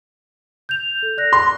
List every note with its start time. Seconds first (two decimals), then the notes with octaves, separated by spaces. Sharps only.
0.69 G6 F7
1.03 A4
1.18 D5 F#6 A#6
1.33 C6